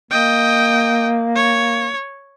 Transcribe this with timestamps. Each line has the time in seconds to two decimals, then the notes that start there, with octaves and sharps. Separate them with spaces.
0.11 A#3 D#5 G5
1.36 C#5